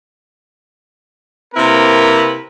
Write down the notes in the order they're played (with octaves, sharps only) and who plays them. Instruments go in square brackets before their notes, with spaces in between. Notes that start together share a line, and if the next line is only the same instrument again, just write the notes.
[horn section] C3 A#3 C4 E4 A#4 B4